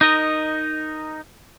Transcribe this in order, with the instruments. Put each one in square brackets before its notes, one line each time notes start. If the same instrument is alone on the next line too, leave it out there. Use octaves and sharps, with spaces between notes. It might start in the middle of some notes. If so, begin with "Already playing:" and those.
[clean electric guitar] D#4 A#4 D#5